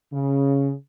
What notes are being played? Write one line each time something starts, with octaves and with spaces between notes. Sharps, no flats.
C#3